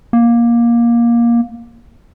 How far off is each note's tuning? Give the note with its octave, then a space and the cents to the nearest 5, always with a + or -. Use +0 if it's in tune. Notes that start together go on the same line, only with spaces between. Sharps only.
A#3 +15